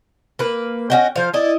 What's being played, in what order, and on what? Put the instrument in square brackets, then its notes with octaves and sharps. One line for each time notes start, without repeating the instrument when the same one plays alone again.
[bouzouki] A#3 B4
[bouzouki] C#4 F#4 G5 [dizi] D#5
[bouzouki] F3 F5 [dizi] C5
[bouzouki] E4 D#5 [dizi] D5